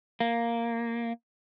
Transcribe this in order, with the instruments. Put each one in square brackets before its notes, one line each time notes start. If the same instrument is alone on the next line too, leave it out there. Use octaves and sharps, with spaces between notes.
[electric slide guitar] A#3